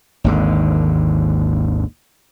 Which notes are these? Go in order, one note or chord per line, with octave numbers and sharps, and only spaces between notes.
G#1 D#2 D3